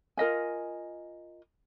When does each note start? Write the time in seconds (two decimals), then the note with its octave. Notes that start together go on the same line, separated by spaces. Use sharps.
0.17 F4 A#4 D#5 G#5